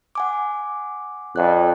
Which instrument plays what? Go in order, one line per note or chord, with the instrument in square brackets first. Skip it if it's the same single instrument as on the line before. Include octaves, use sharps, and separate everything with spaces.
[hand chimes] F#5 G#5 D6
[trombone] F2 [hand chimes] D5 F#6